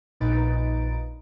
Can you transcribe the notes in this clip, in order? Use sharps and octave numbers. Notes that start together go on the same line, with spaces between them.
A#1 A#2 D#4 B4 A6 D7